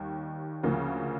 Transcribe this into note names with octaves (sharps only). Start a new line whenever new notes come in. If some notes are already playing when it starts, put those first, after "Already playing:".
Already playing: D#2 D#3 G3
D2 C#3 F3 A#3